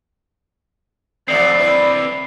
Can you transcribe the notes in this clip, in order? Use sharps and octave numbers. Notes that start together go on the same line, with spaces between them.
F3 A3 B3 C4 D4 D5 C7
E4 B4